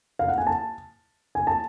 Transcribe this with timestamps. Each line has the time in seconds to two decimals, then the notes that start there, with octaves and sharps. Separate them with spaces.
0.19 F5
0.28 F#5
0.38 G#5
0.47 A5
1.35 G#5
1.47 A5